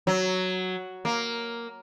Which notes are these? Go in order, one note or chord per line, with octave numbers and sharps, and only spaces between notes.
F#3
A#3